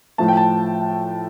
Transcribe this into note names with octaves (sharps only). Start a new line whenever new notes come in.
A2 F3 A3 A5
G5
A5